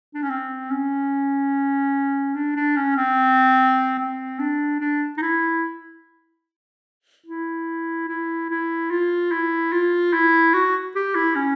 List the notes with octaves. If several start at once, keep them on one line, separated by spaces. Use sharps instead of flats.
D4
C#4
C4
C#4
D4
D4
C#4
C4
C4
D4
D4
D#4
E4
E4
E4
E4
F4
E4
F4
E4
F#4
G4
E4
C#4